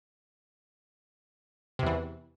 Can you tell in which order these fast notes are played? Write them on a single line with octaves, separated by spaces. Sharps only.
C3 E2 E3